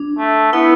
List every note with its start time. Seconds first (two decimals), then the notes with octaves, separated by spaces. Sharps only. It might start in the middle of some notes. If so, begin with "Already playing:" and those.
Already playing: D4
0.19 A3
0.52 B3 E4